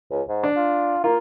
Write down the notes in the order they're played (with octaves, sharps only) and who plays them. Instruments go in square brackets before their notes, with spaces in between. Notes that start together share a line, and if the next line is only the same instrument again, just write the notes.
[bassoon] C#2
G#2
[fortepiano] D4
[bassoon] F4
[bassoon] A#3 [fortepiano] F4